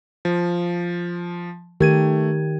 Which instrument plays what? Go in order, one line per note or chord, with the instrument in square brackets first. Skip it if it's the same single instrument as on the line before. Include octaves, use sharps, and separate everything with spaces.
[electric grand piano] F3
[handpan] D#3 G4 A#4 [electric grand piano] A3 G#6 D#7